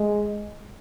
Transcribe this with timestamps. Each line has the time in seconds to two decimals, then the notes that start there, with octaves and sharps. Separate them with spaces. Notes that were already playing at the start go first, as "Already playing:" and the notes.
Already playing: G#3